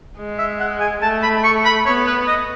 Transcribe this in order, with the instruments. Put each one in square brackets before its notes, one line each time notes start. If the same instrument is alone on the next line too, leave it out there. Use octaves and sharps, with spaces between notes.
[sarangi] G#3
[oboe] E5
F#5
G#5
[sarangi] A3 [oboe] A5
[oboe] B5
C#6
B5
[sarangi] B3 [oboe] C#5
[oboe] B4
D#5